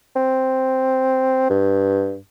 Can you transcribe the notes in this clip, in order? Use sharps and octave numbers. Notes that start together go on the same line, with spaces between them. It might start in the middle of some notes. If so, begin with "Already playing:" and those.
C4
G2